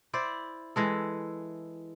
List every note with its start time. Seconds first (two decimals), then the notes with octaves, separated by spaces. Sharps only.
0.13 E4 C5 D5
0.76 E3 G#3 A4